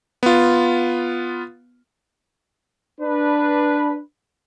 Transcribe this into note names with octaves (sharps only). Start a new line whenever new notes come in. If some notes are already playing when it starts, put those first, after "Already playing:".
B3 F4
D4 B4